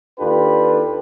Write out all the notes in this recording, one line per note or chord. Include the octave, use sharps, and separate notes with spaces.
D#2 D4 F4 G4 A4 B4